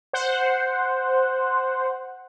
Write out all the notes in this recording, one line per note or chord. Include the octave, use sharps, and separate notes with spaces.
C5 F#5